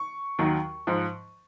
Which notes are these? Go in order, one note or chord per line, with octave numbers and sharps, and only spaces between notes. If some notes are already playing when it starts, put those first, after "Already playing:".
Already playing: C#6
D#2 D#3 F#3
G#2 F3